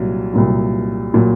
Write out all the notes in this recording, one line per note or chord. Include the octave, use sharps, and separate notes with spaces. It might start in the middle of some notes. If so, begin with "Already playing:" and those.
Already playing: C2 A#2 F#3
C2 A#2 F#3
A#2 F#3